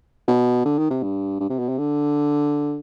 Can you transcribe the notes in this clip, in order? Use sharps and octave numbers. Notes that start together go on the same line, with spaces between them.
B2
D3
D#3
C3
G2
G2
C3
B2
C3
D3